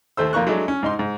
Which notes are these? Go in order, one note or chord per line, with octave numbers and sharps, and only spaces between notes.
D#2 A3 C5 E6
F2 A#3 F4 A#5 C#6 F#6
F#3 G#3 A3 D4
C#4
G#2 D#4 C6
G#2